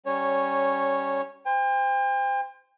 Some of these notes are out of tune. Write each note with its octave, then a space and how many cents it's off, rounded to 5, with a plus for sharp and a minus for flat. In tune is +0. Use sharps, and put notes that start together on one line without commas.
G3 -15 C#4 +0 C#5 -10
C5 -20 G5 +40